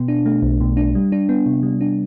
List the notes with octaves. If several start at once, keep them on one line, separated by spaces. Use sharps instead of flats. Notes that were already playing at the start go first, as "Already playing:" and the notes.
Already playing: B2 B3
D4
A3
B1
B2
D4
G3
D4
B3
C3
G3
D4